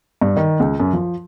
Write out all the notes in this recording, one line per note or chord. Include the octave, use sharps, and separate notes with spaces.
G2
D#3
C#2
F#2
F3